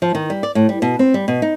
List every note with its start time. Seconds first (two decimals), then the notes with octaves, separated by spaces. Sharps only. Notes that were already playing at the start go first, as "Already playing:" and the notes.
0.02 F3
0.15 D#3
0.30 G3
0.43 D5
0.55 A2
0.69 G3
0.82 B2
0.99 C4
1.14 G3
1.28 B2
1.42 D#4